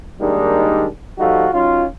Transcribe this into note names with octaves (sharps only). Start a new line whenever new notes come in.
D#3 G3 G#3 A#3 D4 D#4
F3 G3 A3 D#4 F4 F#4
F#3 C#4 D#4 F4